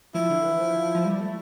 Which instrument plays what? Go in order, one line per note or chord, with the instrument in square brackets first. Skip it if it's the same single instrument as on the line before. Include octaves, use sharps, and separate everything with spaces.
[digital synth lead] F3 [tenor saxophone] E4
[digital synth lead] D3
E3
F3
F3
G3
A3